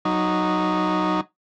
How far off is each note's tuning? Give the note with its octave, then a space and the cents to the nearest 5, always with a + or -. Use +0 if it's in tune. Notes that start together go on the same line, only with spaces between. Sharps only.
F#3 +0 D#4 -5